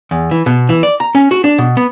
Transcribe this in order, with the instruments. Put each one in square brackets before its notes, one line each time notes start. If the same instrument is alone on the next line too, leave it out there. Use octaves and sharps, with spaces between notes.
[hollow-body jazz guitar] E2
E3
B2
E3
D5
A#5
C#4
F#4
D4
B2
B3